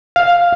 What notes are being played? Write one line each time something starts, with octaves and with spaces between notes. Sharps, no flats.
F5